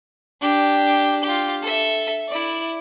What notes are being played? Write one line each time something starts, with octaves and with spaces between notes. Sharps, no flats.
D4 G4
F4 G4
A4 E5
E4 D5